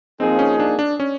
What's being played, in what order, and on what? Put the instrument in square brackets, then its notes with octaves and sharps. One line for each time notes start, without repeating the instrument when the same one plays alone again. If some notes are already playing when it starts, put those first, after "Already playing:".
[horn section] F3 A#3 D#4 G#4 [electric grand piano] C4
[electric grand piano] C#4
D4
D4
C#4